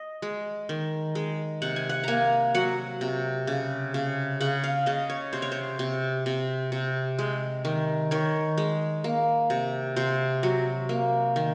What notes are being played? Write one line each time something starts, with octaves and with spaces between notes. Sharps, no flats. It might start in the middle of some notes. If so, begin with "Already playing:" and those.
Already playing: D#5
G#3
D#3
G#3
C3 F#5
G#5
F#5
A#3 G#5 A#5
F#3 F#5
C3
C#3
C#3
C#3 F#5
F5
C#3 D#5
C#5
C3 C5
C#5
C5
C3
C3
C3
G#3
D#3
D#3 C#5
G#3
A#3
C3
C3 C5
F#3
A#3
D#3